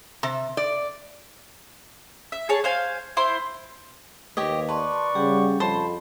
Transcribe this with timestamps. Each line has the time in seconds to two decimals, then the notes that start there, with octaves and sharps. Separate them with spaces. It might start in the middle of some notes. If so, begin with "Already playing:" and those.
0.23 C3
0.57 D5
2.32 E5
2.49 G#4 C#5 A5
2.64 C5 F5 G#5
3.17 E4 C5 C6
4.37 D#2 G4 B4 C#5 D#5
4.69 B4 D5 A5 C6 C#6
5.15 C#3 G3 G4 F#5
5.60 F2 C5 A5 B5 C6